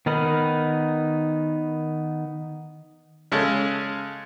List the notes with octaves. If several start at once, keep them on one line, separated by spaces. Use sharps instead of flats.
D#3 B3 D#4 A#4 B5
C#3 G#3 A4